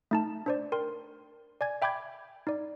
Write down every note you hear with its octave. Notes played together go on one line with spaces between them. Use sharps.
A3 D#4 A5
D4 C5 D5
A#4 G5 C6
D5 G#5 G#6
E5 G5 B5 D6 G6 G#6
D#4 D5